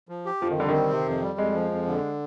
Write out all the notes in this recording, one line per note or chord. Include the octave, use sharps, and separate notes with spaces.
F3
G4
F2 F3
D#3
D3 G3
D#3
C4
C3
F2
G3
F2 G#3
F3
F2
D3